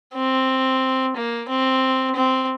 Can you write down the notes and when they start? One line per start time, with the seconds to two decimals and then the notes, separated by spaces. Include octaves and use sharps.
0.15 C4
1.16 A#3
1.49 C4
2.16 C4